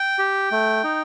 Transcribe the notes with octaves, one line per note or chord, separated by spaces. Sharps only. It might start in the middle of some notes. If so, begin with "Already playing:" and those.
Already playing: G5
G4
A3
D#4